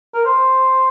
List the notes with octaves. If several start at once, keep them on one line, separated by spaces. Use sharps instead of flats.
A#4
C5